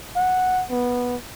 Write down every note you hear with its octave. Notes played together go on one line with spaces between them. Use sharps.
F#5
B3